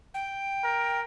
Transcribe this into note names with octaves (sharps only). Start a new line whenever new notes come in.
G5
A#4